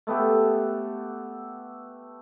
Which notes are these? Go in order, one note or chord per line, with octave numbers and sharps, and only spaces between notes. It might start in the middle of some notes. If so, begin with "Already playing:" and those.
A3 B3 G4 A4